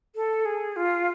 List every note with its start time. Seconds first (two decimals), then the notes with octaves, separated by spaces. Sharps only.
0.16 A4
0.45 G#4
0.76 F4